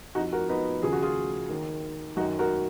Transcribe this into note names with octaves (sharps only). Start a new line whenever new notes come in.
F2 F3 D#4 F#4
F#4 A#4
B3 D#4
D#2 C#3 F3 G#4
F#4
F4 G#4
D#2 D#3
F#2 D#3 D#4 F#4
F#4 A#4